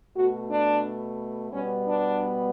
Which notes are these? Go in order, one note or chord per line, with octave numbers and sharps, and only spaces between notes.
B2 A3 F#4
D4
B2 G3 B3 C#4
D4